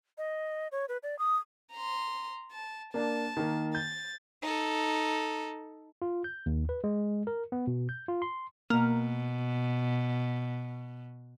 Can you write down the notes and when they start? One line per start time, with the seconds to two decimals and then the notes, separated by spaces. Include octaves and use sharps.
0.18 D#5
0.72 C#5
0.89 B4
1.03 D5
1.19 D#6
1.73 A#5 C6
2.52 A5
2.94 A#3 D4 A5
3.37 D#3 A#3
3.75 G6 A6
4.42 D#4 A4
6.02 F4
6.24 G6
6.46 D#2
6.69 B4
6.84 G#3
7.27 A#4
7.52 B3
7.67 B2
7.89 G6
8.08 F4
8.22 C6
8.70 B2 A#3